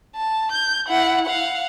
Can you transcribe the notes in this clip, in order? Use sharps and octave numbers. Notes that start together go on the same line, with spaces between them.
A5
G6
E4 F#5
F5 F#5